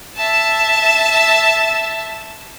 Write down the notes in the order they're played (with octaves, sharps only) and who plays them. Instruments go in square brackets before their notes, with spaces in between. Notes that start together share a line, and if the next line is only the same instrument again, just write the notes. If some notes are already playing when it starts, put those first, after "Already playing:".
[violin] E5 A5